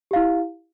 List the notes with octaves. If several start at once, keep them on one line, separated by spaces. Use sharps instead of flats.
E4 G4 F5